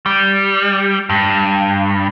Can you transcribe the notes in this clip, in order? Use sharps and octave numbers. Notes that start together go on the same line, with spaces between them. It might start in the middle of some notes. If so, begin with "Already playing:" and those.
G3
G2